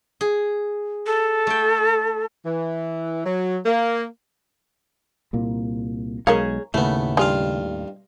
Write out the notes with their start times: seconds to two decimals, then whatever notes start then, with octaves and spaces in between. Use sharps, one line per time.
0.21 G#4
1.06 A4
1.47 A3 G5
2.44 E3
3.25 F#3
3.65 A#3
5.33 C2 A#2 A#3
6.27 B1 G#3 G#4 A#4 C#5 F5
6.74 D#2 A2 C#3 A3 B3
7.17 G2 G#3 F4 F5